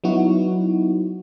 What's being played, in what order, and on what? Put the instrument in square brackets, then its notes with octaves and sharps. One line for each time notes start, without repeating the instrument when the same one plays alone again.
[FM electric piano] F#3 B3 D#4 E4 F#4